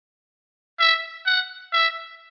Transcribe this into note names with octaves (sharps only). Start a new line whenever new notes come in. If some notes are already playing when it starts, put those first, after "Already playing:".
E5
F#5
E5